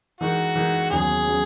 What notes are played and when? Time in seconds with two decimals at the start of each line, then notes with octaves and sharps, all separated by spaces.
0.20 E3 G#3 D#4 F#4 A#4
0.55 E3 G#3 D#4 A#4
0.90 D#2 C#3 F#3 B3 G#4
1.27 C#3 F#3 B3